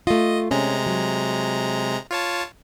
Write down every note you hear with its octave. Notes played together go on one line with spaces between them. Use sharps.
A3 F4 D#5
C3 G#3 C#4 A#5
F#3
F4 C#5 A5